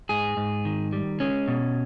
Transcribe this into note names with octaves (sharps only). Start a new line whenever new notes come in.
G#2 G#4
G#2
D#3
G3
G#3 C#4
B2